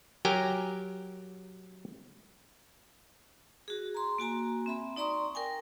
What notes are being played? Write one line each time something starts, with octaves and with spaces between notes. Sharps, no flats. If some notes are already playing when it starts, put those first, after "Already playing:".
F#3 G4 A#4 G5 G#5 A#5
F#4 G#4
A#5 C6
A#3 F#4 G#5 A#5
C4 E5 B5
D#4 D5 A#5 C6 C#6 D#6
A#4 G5 G#5